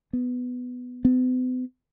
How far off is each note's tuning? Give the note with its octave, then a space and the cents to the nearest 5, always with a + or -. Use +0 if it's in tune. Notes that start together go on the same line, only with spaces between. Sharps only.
B3 +10
B3 +45